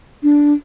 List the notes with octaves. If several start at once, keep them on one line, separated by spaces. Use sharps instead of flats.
D4